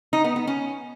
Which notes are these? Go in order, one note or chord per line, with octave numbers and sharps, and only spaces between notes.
D#4
B3
B3
C#4